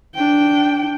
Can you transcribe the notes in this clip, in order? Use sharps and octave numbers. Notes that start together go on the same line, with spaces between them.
D4 G5